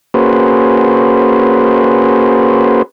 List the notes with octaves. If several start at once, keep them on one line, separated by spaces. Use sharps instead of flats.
A#3 C#4 F#4 G#4 B4 C5